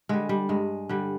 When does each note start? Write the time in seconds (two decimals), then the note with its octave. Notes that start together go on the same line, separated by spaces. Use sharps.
0.09 D3 G3 G#3
0.29 G3
0.49 G2 G#3
0.89 D3 G3